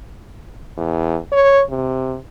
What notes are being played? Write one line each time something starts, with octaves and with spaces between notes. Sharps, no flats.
E2
C#5
C3